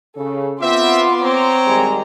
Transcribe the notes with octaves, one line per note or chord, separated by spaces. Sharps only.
C#3 A4
B3 C4 F4 E5 C6 D6
C4 C#5 A#5
D#3 G3 G#3 G#4